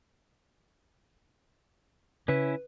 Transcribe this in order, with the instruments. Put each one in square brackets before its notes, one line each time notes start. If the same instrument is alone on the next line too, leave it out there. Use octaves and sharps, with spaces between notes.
[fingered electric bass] C#3 [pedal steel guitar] C#4 E4 E5 [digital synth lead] B4